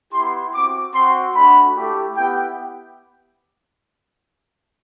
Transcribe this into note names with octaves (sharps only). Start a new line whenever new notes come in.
B3 E4 G4 C6
C4 F#4 D6
C4 F#4 C6
A3 D4 F#4 B5
A3 E4 G4
B3 E4 G4 G5